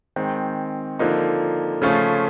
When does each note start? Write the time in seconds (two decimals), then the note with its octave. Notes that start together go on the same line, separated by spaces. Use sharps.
0.16 D#3 G#3 C4
0.99 D3 F3 A#3 D#4
1.82 C#3 F3 A3 C#4 F4